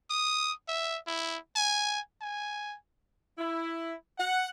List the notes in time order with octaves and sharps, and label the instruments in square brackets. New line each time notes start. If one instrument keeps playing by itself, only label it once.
[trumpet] D#6
E5
E4
G#5
G#5
[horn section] E4
F#5